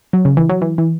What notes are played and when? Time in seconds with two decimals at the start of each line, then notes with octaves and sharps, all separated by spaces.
0.13 F#3
0.25 C#3
0.37 E3
0.49 F#3
0.62 E3
0.78 E3